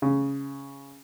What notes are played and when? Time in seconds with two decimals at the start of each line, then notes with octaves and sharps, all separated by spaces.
0.02 C#3